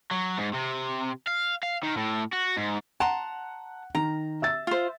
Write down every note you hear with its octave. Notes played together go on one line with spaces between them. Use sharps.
F#3
G#2
C3
F5
F5
D#3
A2
F#4
G#2
F#5 A5 A#5 C6
D#3 A#5
E5 E6 A6
F4 C5